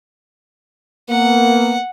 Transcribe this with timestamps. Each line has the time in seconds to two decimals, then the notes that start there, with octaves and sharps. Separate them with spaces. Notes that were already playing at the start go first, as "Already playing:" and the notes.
1.10 A#3 B3 F#5